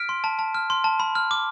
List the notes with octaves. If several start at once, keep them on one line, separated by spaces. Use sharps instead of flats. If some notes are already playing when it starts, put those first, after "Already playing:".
Already playing: F6 B6 D7
C6
A5
A5
F6
C6
A5
B5
F6
D6